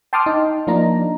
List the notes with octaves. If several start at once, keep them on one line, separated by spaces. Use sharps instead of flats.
G5 A5 C6 D6 D#6 F6
D#4
F3 A#3 D4 D#4 A#5